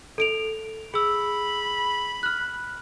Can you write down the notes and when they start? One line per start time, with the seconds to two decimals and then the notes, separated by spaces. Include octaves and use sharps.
0.18 A4 D7 F7
0.94 G#4 B5 E6
2.23 F6 F#6